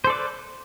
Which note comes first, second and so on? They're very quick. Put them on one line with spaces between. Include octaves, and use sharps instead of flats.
C5 A4 D5 B4